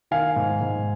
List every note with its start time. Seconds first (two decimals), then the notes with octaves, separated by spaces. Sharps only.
0.11 D#3 F5 G#5
0.36 G#2
0.61 G#2